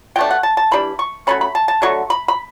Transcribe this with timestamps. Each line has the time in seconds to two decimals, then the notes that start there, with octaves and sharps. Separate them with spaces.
0.16 B2 A3 D4 G5
0.31 F#5
0.43 A5
0.57 A5
0.71 E3 G3 D4 B5
0.99 C#6
1.27 F#3 A3 C#4 B5
1.41 B5
1.55 A5
1.68 A5
1.82 D3 F#3 A3 C#6
2.10 B5
2.28 B5